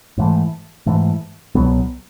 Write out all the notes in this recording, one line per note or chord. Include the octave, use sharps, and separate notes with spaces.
G#2 E3 A3
G#2 E3 A3
C2 B2 F#3 B3